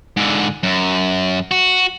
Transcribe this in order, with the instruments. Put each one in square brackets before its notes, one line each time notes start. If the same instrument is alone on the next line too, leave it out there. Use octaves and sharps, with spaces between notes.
[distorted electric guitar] G#2 D3
F#2
F#4